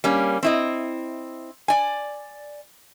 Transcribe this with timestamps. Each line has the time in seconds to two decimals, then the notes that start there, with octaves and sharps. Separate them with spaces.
0.04 G3 A#3 C#4
0.43 C4 E4 D#5
1.68 D5 G#5